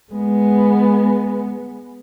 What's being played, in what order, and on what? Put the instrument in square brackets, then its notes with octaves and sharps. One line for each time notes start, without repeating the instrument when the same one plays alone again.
[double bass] G#3 B3